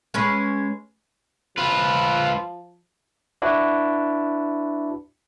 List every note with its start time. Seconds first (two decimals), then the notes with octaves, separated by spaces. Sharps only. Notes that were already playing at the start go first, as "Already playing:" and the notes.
0.14 G#3 C#4 B4
1.58 F3 F4 B4
3.42 D4 E4 F#4 B4